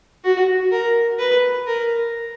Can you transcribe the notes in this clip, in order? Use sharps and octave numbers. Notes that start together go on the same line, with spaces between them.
F#4
A#4
B4
A#4